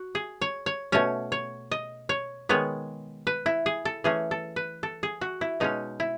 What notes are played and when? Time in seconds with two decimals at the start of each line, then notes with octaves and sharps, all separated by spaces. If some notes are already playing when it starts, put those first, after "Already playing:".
Already playing: F#4
0.15 G#4
0.41 C#5
0.66 C#5
0.92 B2 A3 C#4 C#5
1.32 C#5
1.71 D#5
2.09 C#5
2.49 D#3 G#3 B3 C#5
3.27 B4
3.46 E4
3.66 G#4
3.85 A4
4.04 E3 A3 C#4 G#4
4.31 A4
4.56 B4
4.83 A4
5.03 G#4
5.21 F#4
5.41 E4
5.60 B2 G#3 C#4 D#4
6.00 E4